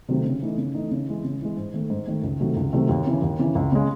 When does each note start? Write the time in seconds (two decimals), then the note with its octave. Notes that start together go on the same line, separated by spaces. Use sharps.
0.09 C3 D#3 F#3 A3
0.25 C#3
0.41 E3 A3 D#4
0.58 C#3
0.74 E3 A3 D#4
0.91 C#3
1.08 E3 G#3
1.24 C#3
1.41 E3 G#3
1.57 G#2
1.74 D#3 A3
1.90 G#2
2.07 D#3 A3
2.23 C#2
2.40 C3 D#3 F#3 A3
2.56 C#2
2.73 C3 D#3 F#3 A3
2.89 D#2
3.06 C#3 E3
3.22 D#2
3.39 C#3 E3
3.55 C#2
3.72 C#3 G#3